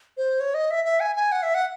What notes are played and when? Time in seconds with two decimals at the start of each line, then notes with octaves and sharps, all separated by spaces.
0.17 C5
0.40 C#5
0.54 D#5
0.71 E5
0.85 E5
1.00 G#5
1.16 G#5
1.32 F#5
1.43 E5
1.55 F#5